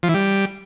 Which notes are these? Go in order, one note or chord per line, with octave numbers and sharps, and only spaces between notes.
F3
E3
G3